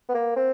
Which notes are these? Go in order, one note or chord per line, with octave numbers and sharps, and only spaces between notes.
B3
A#3
C4